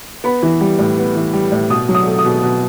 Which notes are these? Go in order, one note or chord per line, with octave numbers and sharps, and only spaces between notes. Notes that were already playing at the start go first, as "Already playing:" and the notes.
B3 B5
E3
G3
A2
B3
E3
G3
A2
B2 D#6
F#3
D#6
A3
D#6
B2
B2